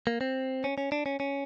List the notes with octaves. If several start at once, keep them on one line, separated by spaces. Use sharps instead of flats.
A#3
C4
C#4
C#4
D4
C#4
C#4